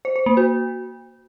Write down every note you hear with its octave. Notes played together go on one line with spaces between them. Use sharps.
C5
C5
A#3
F#4